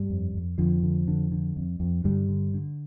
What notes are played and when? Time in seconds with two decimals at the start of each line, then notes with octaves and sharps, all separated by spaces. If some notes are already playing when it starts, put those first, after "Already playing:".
Already playing: G2 G3
0.10 F2
0.35 F2
0.58 F2 D3 F3
0.83 D3
1.08 D3
1.31 D3
1.56 F2
1.80 F2
2.04 G2 D3 G3
2.29 D3
2.54 D3